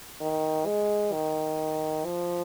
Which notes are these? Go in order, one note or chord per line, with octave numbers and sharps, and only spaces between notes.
D#3
G#3
D#3
F3